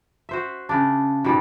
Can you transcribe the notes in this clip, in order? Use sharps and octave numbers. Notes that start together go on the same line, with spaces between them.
F#4 C5 E5
C#3 D4
G#2 B2 G3